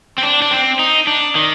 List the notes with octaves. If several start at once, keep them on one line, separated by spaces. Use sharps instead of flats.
C4
D4
D4
C4
D#4
D4
D#3